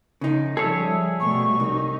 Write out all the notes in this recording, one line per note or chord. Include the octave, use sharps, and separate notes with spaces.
C#3 D#4
F3 G3 G#4 A4 C#5 E5
B2 G3 A3 C#6
C2 D#4